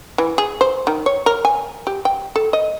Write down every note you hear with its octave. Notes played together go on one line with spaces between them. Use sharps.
E3
G#4
C5
D#3
C#5
A#4
G#5
G4
G5
A4
D#5